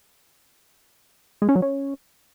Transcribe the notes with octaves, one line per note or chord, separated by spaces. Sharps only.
G#3
C#4
F#3
C#4